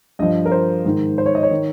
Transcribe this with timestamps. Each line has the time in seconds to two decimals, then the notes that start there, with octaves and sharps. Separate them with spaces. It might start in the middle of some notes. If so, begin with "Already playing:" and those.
0.19 G2 F3 D#5
0.46 A#4
0.52 C5
0.85 G#2 D#3
1.18 C5
1.26 C#5
1.35 D#5
1.43 C#5
1.51 D#3